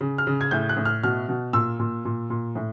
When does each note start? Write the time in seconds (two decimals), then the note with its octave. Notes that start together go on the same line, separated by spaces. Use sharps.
0.01 C#3
0.18 F6
0.27 C#3
0.41 G#6
0.51 A2 G6
0.69 F#6
0.77 A2
0.85 F6
1.03 B2 F6
1.29 B2
1.53 A#2 E6
1.79 A#2
2.05 A#2
2.30 A#2
2.55 A2